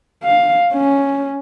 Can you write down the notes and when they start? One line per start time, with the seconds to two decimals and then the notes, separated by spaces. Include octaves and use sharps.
0.24 F5
0.74 C#4